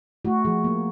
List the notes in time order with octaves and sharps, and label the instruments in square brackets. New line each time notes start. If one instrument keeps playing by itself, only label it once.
[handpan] A3 F#4
F3 G#4
A#3